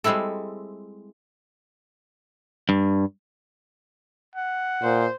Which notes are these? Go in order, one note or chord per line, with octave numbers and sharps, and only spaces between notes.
G3 G#3 C4 E4 A4
G2
F#5
A#2 C5